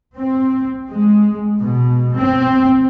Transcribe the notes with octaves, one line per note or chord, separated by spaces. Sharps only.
C4
G#3
B2
C4